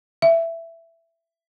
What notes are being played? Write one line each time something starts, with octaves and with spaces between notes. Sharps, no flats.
E5